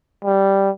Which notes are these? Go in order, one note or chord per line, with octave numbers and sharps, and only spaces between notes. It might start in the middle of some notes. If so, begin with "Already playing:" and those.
G3